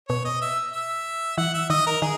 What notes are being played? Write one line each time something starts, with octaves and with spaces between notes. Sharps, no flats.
B2 C#5
D#5
E5
E5
E3 F#5
E5
D#3 D#5
A#4
D#3 G#4